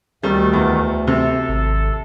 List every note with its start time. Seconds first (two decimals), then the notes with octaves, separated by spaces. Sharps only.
0.23 D2 D#3 G3 A3
0.53 E2
1.07 C3 A4
1.49 G#1